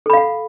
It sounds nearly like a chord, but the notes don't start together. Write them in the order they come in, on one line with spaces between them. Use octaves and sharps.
A4 B5 F5 F#5